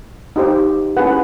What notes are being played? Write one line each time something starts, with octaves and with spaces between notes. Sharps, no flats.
D#4 G4 C5
C#4 E4 G#4 B4 F#5